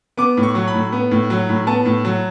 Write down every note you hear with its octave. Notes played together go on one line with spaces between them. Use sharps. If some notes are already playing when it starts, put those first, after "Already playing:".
B3 D6
A2
C#6
F#3
B5
A2
B3
A2
F#3
A2
B3 A5
A2
F#3